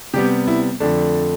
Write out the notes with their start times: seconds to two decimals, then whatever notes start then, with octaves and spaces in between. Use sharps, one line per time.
0.14 C3 G3 B3 G4
0.48 E4
0.80 F2 D3 A3 D4